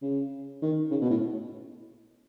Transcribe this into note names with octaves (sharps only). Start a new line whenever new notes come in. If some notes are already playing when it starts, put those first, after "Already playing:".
C#3
D#3
C#3
B2
A2